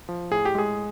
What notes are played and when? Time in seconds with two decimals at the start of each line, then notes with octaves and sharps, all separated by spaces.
0.09 F3
0.31 A2 G#4
0.45 G4
0.55 G#3 G#4